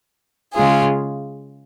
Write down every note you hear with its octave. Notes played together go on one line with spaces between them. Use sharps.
C#3 G#3 F4 G#4